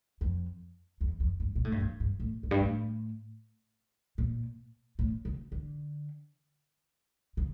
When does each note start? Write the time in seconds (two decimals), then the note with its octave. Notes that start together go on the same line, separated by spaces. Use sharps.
0.21 F2
1.01 E2
1.20 F2
1.40 G2
1.55 A#2
1.65 A2
1.72 G2
1.80 F2
2.00 G2
2.20 A2
2.43 F2
2.51 G2
2.60 A2
4.18 A#2
4.99 A2
5.25 C#3
5.52 D3
7.37 C#3